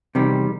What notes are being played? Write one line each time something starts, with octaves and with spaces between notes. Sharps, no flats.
E2 C3 D#3 G3